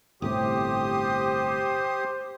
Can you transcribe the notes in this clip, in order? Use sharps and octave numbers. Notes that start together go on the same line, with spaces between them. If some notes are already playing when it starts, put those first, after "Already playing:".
G1 A2 C3 G4 C5 D#6